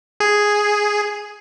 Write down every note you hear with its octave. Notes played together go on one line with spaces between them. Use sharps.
G#4